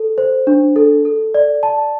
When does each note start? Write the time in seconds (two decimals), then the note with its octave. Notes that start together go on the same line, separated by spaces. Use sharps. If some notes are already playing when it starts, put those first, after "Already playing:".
Already playing: A4
0.18 C5
0.47 D4
0.76 A4
1.05 A4
1.34 D5
1.63 A5